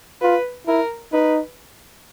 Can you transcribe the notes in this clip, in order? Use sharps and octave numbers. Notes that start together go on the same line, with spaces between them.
F4 B4
E4 A#4
D#4 B4